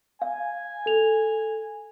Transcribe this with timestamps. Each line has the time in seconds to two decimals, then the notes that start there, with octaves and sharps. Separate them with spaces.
0.22 F5 G#5
0.86 A4 F7